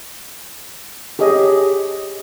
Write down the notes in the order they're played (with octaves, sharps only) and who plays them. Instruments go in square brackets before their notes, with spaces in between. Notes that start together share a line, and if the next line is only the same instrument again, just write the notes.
[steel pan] G4 G#4 C#5 D#5